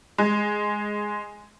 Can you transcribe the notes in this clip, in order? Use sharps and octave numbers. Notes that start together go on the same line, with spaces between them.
G#3